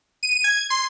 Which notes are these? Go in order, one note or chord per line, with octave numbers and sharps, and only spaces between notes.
D#7
G#6
C6